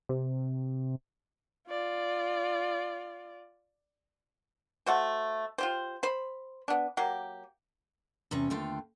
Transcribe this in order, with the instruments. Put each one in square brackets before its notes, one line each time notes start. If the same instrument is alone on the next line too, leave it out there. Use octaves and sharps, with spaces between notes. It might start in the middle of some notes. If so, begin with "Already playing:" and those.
[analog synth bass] C3
[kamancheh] F4 D5
[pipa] A3 F#4 C5
F4 G4 C5
C5 B5
B3 D4
F#3 A#3 G4
[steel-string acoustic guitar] E2 C3 C#4 C#5
D#2 D3 A3 F4 G5